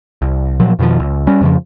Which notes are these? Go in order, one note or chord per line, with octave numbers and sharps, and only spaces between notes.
C2
A#2 F3 F#3
F2 B2 D#3 F3
C#2
G3 C#4
F2 C#3 F3